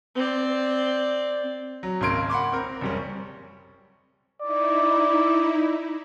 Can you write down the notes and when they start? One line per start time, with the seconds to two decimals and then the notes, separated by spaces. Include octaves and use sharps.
0.15 C4 D5
1.83 F#3
2.01 G#1 C#3 A#3 C6 G#6 D7
2.30 F#5 B5 C6 D6
2.52 C4 A#4
2.81 F#1 G3 C#4
4.41 D#4 E4 D5